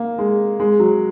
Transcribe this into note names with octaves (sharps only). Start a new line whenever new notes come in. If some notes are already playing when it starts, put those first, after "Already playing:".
Already playing: A#3
G#3
G#3
F#3